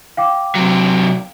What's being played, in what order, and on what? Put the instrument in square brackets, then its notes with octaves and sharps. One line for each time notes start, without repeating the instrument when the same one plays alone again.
[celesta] F5 G5 D6
[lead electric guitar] C3 F#3